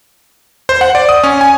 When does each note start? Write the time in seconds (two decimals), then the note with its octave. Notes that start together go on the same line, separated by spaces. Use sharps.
0.69 C5
0.81 F#5
0.95 D5
1.09 D#6
1.23 C#4
1.41 G#5